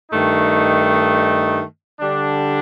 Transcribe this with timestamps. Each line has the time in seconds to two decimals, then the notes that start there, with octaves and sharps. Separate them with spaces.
0.12 G2 D#3 A3 D#4
2.01 D3 G3 D4